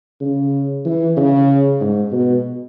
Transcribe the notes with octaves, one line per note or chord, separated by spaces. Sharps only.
C#3
E3
C#3
G#2
B2